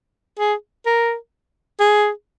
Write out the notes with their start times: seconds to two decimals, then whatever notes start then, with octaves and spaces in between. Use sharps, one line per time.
0.40 G#4
0.86 A#4
1.80 G#4